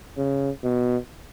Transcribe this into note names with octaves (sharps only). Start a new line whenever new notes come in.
C#3
B2